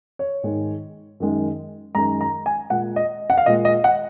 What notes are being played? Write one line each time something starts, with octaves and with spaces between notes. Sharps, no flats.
C#5
G#2 D#3 G#3
F#2 D#3 G#3
F#2 D#3 G#3 A#5
A#5
G#5
A#2 G#3 F#5
D#5
F#5
F5
A#2 G#3 D#5
D#5
F#5